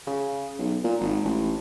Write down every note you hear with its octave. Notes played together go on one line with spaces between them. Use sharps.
C#3
B1
A#2
G#1
A1